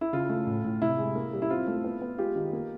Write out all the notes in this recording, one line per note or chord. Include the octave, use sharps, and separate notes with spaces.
E4
C#3 F4
A3
A2
A2
C3 E4
G#3
A#3
G3
E4
C4 F4
A3
B3
B3
G#3 F4 G4
D#3
A#3